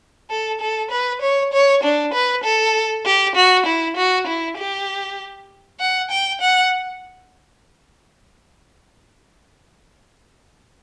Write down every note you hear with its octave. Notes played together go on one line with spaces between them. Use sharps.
A4
A4
B4
C#5
C#5
D4
B4
A4
G4
F#4
E4
F#4
E4
G4
F#5
G5
F#5